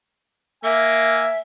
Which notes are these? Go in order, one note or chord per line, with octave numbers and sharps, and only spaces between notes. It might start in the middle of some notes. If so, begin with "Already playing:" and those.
A#3 E5 G#5 E6